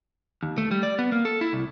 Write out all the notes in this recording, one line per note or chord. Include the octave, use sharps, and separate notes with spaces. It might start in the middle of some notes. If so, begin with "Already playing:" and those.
D#2
A3
G3
D5
B3
A#3
A4
E4
C2